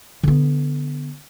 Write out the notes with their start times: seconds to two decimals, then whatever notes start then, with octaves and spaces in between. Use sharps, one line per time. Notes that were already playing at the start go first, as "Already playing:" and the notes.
0.23 D3 B3